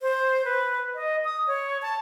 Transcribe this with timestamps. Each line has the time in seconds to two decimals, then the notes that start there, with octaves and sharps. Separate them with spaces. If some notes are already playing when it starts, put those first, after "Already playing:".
0.02 C5
0.45 B4
0.95 D#5
1.25 D#6
1.47 C#5
1.82 A5